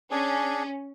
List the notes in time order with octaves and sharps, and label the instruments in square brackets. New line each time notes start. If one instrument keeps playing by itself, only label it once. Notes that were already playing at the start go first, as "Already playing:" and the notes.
[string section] C#4 [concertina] D4 G#4